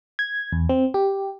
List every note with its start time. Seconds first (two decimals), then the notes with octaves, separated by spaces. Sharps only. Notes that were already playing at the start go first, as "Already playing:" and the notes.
0.19 G#6
0.53 E2
0.69 C4
0.94 G4